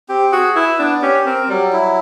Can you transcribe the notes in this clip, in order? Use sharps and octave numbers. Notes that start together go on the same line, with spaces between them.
C4 G4
F#4 G#4
E4 B4
B3 D4
C#4 G4
C4 A#4
F#3 G3
E4